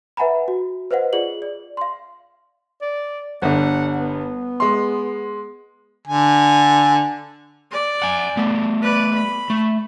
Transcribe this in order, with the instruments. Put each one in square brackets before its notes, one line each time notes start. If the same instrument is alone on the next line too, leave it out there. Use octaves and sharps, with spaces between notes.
[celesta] B4 E5 F#5 G#5 A#5 B5
F#4
B4 C5 D#5 F5 F#5
F4 G#4 D5 F#7
D5
F5 C6
[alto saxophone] D5
[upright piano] G1 D3 [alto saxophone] F#5
[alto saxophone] B3
[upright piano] G#3 C6
[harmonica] D3 G#5
[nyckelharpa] D5
[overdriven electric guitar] F#5 G#5
A3 B3
[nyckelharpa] B4 D5
B5
[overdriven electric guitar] A3